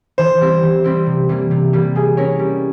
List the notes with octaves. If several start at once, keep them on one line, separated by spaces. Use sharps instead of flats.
E3 C5
G3 C4 E4
E3
G3 C4 E4
C3
E3 G3 A#3
C3
E3 G3 A#3
G3 G#4
C#4 E4 A#4 C#5
G3